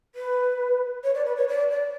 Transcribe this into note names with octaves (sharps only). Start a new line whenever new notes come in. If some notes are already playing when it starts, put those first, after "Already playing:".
B4
C#5
D5
B4
C#5
D5
D5